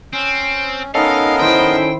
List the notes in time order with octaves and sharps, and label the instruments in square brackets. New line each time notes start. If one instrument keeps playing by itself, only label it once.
[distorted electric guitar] C4 [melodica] C#4
[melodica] B3 A#4 D#5 [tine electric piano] C#4 A4 [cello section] D#4 [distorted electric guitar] F5
[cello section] D#3 E4 C5 [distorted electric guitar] G5